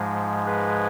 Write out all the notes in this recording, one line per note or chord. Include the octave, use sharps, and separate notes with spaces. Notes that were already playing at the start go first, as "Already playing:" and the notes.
Already playing: G#2 F3 G#3
G#4 B4